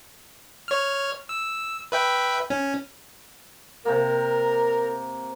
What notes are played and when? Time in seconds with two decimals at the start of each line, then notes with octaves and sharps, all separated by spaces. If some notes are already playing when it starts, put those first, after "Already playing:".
0.68 C#5 F6
1.29 E6
1.92 B4 E5 G5
2.50 C#4
3.85 C3 A#3 A#4